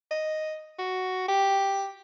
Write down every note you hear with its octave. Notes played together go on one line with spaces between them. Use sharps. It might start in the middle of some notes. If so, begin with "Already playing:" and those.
D#5
F#4
G4